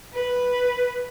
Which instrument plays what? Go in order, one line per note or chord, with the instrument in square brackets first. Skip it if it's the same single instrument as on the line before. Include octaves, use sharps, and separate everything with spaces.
[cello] B4